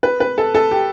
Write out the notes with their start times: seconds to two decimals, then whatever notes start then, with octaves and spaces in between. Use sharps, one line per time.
0.03 B4
0.20 B4
0.38 A4
0.55 A4
0.71 G4